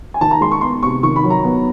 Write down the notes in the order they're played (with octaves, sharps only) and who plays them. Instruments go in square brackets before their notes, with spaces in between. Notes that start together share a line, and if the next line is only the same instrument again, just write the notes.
[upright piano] G#5
D#3 A5
A#5
G#3 C6
C#6
B3 C6
C3 C#6
D#3 C#6
B5
F#3
A#5
B3